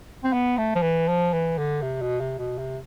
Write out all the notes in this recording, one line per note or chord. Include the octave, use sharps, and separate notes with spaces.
C4
B3
A3
F3
E3
F3
E3
D3
C3
B2
C3
B2
C3